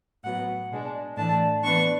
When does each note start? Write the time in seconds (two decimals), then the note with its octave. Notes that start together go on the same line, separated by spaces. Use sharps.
0.23 A2 F#3 B3 F#5
0.70 B2 G#3 D4
1.16 A2 E3 A3 D4 A5
1.63 E3 B3 D4 C#6